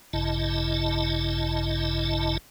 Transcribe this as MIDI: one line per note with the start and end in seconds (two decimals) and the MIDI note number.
0.13 2.37 33
0.13 2.37 43
0.13 2.37 49
0.13 2.37 64
0.13 2.37 75
0.13 2.37 81